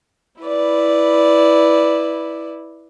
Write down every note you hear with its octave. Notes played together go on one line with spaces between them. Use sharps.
E4 B4 D5